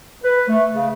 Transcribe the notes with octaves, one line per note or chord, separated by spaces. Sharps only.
B4
A3
C#3